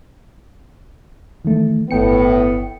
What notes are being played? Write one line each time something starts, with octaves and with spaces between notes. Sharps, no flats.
D#3 E3 A3
G1 A2 B3 G5 C#7